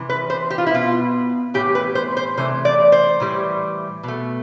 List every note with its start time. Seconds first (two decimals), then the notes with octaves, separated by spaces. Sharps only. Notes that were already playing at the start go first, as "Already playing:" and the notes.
Already playing: C3 E3
0.09 B4
0.30 C5
0.50 G4
0.58 F4
0.67 E4
0.71 B2 B3 F4
1.54 A2 E3 B3 G4
1.75 B4
1.95 C5
2.17 C5
2.37 C3 E3 A3 C5
2.65 D5
2.92 C5
3.20 A2 E3 G3
4.03 B2 A3